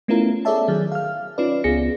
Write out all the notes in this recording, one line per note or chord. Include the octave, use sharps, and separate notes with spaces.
A3 B3 C#4 E4 F4 A#4
G#4 A4 C#5 D5 E5 A5
D#3 F#3 G#4
F5 F6
C#4 D#4 F4 B4 D5
C#2 B3 F4 G#4 A#6 C#7